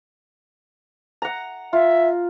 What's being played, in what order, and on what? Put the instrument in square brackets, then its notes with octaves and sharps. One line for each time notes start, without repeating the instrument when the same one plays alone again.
[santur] F#5 A#5
[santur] F4 [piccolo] E5